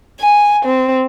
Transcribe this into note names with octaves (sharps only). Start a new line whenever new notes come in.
G#5
C4